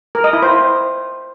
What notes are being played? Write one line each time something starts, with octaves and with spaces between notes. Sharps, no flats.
A#4
D#5
E4
C5